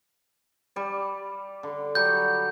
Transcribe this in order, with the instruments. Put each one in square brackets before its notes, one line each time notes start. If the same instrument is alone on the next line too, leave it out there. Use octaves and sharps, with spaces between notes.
[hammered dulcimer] G3 D5
D3
[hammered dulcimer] F#3 G3 [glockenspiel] G6